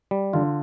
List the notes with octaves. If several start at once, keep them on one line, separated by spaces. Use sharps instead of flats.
G3
D3 F4